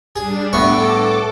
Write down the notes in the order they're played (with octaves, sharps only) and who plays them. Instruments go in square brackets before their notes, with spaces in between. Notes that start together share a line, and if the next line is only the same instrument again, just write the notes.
[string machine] G3 D4 [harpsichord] G#4
[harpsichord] A2 B3 C#6 [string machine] A4 D6